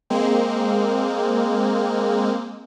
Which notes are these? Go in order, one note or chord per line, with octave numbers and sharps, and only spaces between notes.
G#3 A#3 C4